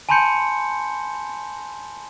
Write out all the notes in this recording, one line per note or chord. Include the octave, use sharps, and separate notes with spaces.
G#5 A5 B5 C6 G6 C#7